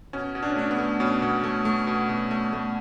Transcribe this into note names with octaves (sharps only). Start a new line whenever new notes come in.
B2 C#4
B2
D4
C#4
A3 D4
B3
A3
B2 C#4
B2
A3
A3
B2
B2
A3
A3